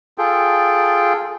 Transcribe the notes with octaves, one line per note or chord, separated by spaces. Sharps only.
F4 G#4 A4 G5